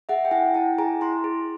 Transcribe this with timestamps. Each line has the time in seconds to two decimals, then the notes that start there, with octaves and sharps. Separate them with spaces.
0.09 G#4 E5 F#5
0.25 G5
0.31 E4 F#5 G#5
0.54 E4 G5 A5
0.78 G#4 G#5 A#5
1.01 E4 A#5 C6
1.24 G#4